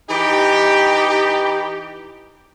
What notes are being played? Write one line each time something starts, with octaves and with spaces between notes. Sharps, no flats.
E3 D#4 G4